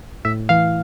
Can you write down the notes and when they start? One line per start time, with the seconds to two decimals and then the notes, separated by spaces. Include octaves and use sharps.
0.25 A2 E5
0.49 E3 F5